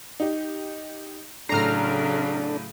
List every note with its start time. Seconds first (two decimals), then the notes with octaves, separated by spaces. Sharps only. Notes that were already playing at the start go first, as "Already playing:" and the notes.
0.20 D#4 G4
1.49 A2 C#3 F#3 D4 A4 A#5 F6 C7